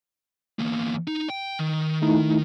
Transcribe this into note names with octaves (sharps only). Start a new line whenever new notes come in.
E2 A#3
D#4
G5
D#3
A3 D#4 E4